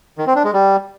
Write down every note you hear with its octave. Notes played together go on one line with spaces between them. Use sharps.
D#3
C4
D4
G#3
G3